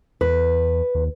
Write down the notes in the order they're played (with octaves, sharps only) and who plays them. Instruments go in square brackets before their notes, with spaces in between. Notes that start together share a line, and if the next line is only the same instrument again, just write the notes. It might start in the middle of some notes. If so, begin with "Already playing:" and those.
[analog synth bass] E2 [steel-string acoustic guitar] B4
[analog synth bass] D#2